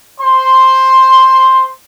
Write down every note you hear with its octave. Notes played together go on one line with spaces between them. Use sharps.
C5 C6